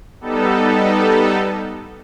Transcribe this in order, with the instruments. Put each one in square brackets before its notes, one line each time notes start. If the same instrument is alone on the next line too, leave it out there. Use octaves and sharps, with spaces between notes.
[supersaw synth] G3 B3 D#4 A4